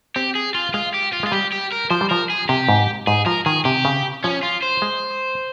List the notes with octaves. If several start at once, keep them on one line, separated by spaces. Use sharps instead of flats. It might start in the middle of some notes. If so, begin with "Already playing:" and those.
C4 G4
G#4
F4
G#3 F4
G4
F4
G#3 F4
G3 G4
G4
A#4
F3 C5
G3
F3 A#4
G#4
C3 G4
G#2
G#2 G#4
F3 A#4
D#3 G#4
C3 G4
C#3
F3 C#4
F4
C5
G#3